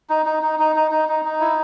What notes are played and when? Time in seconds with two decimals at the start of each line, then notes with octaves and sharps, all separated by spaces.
0.10 D#4
0.26 D#4
0.43 D#4
0.59 D#4
0.76 D#4
0.91 D#4
1.09 D#4
1.25 D#4
1.40 E4